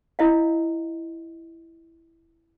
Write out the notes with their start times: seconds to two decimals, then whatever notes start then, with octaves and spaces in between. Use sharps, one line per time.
0.19 E4 D#5 F5